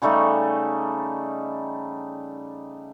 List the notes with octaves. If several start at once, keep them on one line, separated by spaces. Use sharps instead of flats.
C#3 G3 A3 D#4